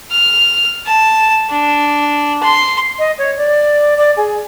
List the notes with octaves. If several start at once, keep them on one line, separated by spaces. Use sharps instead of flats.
F6
A5
D4
C6
D#5
C#5
D5
D5
G#4